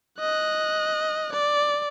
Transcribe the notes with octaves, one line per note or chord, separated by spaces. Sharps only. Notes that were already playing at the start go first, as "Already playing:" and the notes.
D#5 F#6
D5